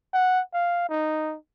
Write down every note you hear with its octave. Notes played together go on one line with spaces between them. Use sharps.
F#5
F5
D#4